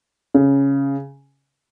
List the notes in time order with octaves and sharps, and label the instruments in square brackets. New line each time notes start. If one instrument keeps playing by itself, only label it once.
[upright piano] C#3